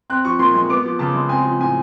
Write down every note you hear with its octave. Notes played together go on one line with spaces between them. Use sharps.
C4 F#6
F3 C#6
A#2 C6
G#3 C6
B3 D6
F3
C#3 A5
G#3
C4 G#5
F3
A2 G#5